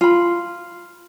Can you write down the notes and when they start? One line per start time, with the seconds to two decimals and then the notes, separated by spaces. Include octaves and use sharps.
0.01 F4 B5